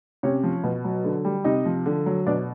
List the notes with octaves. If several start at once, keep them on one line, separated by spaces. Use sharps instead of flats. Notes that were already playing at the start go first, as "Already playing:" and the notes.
C3 C#4 C#5
F3
B2
F#3
D3
G3
C3 D#4 D#5
F3
D3
F#3
B2 D4 D5